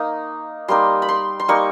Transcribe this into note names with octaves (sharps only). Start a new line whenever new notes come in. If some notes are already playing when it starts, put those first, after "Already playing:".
Already playing: A#3 D#4 C#6
G3 A#3 D#4 C6
B5
C6
C6
G3 A#3 D#4 C#6